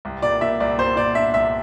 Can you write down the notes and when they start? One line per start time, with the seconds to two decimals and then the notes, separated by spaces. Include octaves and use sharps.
0.05 C2
0.22 A#2 D5
0.41 A#2 E5
0.60 C2 D5
0.78 A#2 C5
0.96 A#2 D5
1.15 D4 E5
1.34 C2 E5